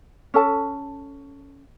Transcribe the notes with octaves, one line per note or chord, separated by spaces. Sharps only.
C#4 A4 A5